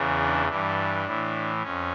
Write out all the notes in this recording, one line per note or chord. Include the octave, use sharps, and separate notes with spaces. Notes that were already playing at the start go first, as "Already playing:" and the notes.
Already playing: E2 C#3 E3
D4
G2 E3 D4
A2 E3
F2 C#4